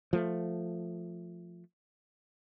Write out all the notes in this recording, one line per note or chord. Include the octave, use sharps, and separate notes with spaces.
F3 A3